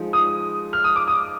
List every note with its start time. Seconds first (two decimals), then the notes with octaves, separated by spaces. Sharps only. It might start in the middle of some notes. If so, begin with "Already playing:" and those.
Already playing: F3 G#3 D#4
0.13 D#6
0.73 F6
0.84 D#6
0.96 D6
1.07 D#6